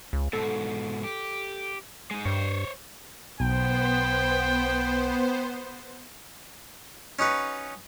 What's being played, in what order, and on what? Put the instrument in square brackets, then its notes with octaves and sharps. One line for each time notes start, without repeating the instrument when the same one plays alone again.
[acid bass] C#2
[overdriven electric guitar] G#2 B2 [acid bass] A4
[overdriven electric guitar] G4
G#3 D#4
[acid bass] G2 [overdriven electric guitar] C5 C#5
[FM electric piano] B1 [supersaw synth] B3 C5 [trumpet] G5
[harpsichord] C#4 D#4 F#4 B4